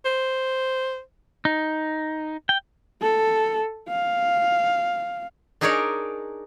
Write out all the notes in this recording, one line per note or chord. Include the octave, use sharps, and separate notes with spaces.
C5
D#4
G5
A4
F5
D4 D#4 G#4 A#4 C#5 D5